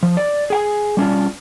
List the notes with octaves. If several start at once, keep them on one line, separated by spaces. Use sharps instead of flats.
F3
D5
G#4 G5 G#5
G3 C#4 D4 F4